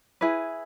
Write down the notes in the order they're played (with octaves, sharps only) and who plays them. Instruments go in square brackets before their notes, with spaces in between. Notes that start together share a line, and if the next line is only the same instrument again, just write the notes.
[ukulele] E4 G#4 B4